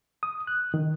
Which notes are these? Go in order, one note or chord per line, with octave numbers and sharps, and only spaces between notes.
D#6
F#6
D#3